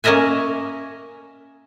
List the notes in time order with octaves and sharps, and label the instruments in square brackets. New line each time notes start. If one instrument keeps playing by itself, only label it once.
[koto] A#3 C#4 A#4 D#5 E5 G#5